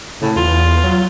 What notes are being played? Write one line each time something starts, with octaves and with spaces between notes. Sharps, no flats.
A2 C#3
E2 F4
F#3